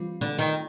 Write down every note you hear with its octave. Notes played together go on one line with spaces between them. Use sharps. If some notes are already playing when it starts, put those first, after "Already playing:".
Already playing: E3 G3 C4 F4
D3
D#3